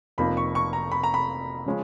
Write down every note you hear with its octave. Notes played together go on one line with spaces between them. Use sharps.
F1 F2 F3 A#3 D#4 B5
C#6
C#6
A#5
B5
A#5
B5
C#3 F3 G#3 C#4